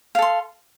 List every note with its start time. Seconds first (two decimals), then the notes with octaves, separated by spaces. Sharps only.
0.15 F5
0.19 A4
0.22 C6